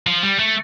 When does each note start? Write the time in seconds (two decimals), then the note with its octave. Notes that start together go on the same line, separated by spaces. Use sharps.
0.07 F3
0.23 G3
0.39 A3